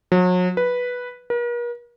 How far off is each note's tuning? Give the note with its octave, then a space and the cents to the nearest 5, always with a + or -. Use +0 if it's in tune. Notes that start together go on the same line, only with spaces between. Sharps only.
F#3 -35
B4 -5
A#4 +45